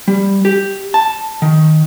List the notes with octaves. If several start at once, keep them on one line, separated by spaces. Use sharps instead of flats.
G3
G4
A5
D#3